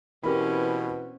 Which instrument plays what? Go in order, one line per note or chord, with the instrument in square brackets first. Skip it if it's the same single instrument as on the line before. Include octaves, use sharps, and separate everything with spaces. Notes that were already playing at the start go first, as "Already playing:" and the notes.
[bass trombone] B2 [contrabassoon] E3 [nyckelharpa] C4 C#4 [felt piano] G4 A#4 B5